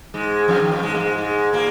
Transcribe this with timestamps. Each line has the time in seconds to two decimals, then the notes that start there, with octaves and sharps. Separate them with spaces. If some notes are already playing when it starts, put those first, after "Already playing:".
0.14 G#2 G#3
0.48 F2 F3
0.60 D#3
0.71 F2 F3
0.83 G#2 G#3
0.94 A#3
1.00 G#2 G#3
1.18 G#2 G#3
1.53 A#2 A#3